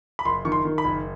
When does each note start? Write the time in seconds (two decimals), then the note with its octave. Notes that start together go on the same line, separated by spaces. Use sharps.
0.19 B5
0.25 F#1 C6
0.45 D#3 C#6
0.52 C6
0.65 D#3
0.78 B5
0.84 F#1